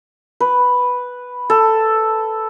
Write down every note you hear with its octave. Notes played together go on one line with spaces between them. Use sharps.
B4
A4